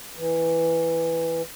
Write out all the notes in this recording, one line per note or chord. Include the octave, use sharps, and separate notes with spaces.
E3